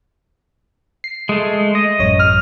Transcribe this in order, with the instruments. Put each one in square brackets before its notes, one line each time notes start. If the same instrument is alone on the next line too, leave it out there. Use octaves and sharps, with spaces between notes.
[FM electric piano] C7
[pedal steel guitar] G#3 A3
D#5
[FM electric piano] A1 F#2 C#5
[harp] F6